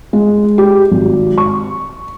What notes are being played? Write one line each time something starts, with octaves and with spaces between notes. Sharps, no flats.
G#3
G4
G#1
C#6